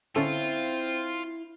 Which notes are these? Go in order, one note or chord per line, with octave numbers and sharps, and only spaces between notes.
D3 C4 C#4 E4 F4 A4